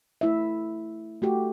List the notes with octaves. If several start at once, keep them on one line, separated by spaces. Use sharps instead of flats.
A3 E4 E5
A3 F#4 G4